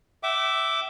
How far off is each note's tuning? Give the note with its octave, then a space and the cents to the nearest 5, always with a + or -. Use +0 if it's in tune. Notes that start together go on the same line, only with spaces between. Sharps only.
E5 +0 G5 -40 D6 +0